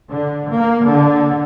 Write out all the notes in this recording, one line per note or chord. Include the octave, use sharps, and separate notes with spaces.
D3
A#3
D3